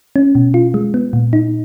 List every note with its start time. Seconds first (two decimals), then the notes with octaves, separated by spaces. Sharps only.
0.16 C#4
0.35 B2
0.54 F4
0.74 G#3
0.94 B3
1.13 A#2
1.33 D#4